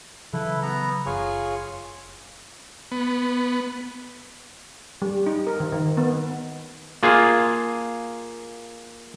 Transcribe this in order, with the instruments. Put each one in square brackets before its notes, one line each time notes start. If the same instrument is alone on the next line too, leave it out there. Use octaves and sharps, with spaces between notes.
[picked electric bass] C#3 E3 F#3 [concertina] E4 A4 B4
[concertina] B3 A#5
[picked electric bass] F#1 [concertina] F4 G#4 C#5
[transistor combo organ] B3
[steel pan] G3
D#4
A#4
D#3
D#3
B3
[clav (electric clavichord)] A#3 F4 G#4